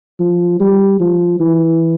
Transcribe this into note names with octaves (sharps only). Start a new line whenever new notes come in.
F3
G3
F3
E3